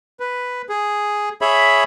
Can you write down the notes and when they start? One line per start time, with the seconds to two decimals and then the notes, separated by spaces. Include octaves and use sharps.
0.20 B4
0.69 G#4
1.41 G#4 C#5 E5 B5